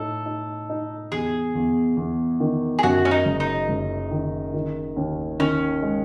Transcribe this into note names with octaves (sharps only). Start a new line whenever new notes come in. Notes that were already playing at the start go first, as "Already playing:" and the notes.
Already playing: A2 D#4 A4
D#4
D#4
E2 G#4
E2
E2
D#3
G#4
F#2 F#4
C#4
D#4
F#1
D#4
F#1
D#3
D#3
D#2
D#3 C#4
G#3